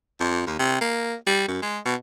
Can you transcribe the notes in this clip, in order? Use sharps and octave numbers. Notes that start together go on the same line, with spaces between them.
F2
D#2
C3
A#3
G3
F#2
G#3
B2